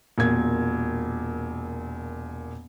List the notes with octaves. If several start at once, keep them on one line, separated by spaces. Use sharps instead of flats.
E1 A#2 G#6